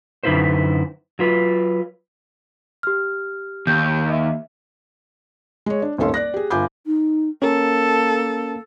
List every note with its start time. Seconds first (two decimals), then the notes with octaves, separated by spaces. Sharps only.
0.24 F#2 D3 D#4 E4 B4 C5
1.19 F#3 F4 B4
2.83 G4 F6
3.67 D#2 G6
4.09 D#5 E5
5.66 G#3 C#5
5.82 D4
5.98 D#1 G#1 C#4 A4 F5 C6
6.14 D5 F#6 A#6
6.34 G4 G#4
6.50 G1 F4 G#5 B5 D6 G6
6.86 D#4
7.42 A#3 C#4 A4 A#4